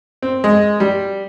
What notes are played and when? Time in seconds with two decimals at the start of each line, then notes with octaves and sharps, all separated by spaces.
0.22 C4
0.44 G#3
0.80 G3